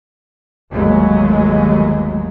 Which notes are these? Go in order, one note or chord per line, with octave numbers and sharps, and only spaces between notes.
G1 D#2 F#3 G#3 A3